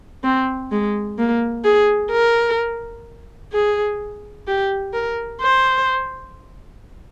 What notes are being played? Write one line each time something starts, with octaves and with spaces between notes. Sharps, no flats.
C4
G#3
A#3
G#4
A#4
G#4
G4
A#4
C5